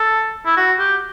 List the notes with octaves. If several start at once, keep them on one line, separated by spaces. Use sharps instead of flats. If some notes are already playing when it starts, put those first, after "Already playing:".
Already playing: A4
E4
F#4
G4